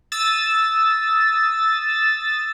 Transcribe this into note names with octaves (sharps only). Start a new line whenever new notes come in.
D#6 E6 A6